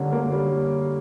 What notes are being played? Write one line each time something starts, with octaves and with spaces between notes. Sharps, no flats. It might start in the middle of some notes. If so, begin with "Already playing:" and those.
Already playing: D3 G3 A#3 C#4
A#3
G3